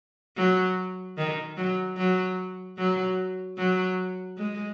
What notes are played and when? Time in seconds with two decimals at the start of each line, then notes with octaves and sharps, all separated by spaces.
0.37 F#3
1.17 D#3
1.57 F#3
1.97 F#3
2.78 F#3
3.58 F#3
4.37 G#3